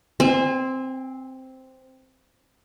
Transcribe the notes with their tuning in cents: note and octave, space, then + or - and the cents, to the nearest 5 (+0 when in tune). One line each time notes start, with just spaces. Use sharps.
C4 +0 G#5 -35